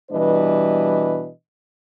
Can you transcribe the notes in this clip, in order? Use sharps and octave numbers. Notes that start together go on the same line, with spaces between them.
B2 E3 G3 D4 B4 D#5